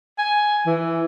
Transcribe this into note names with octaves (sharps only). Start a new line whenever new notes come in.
G#5
E3